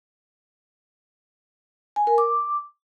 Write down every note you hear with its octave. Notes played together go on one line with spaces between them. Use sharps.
G#5
A#4
D6